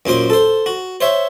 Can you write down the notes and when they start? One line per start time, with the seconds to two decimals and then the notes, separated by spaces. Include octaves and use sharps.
0.06 F#2 A#2 C5 D6
0.30 A4 C5
0.66 F#4
1.01 C5 C#5 E5